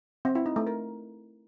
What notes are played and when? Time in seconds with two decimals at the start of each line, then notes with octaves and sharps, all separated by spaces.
0.25 C4
0.35 E4
0.46 D#4
0.56 A3
0.67 A#4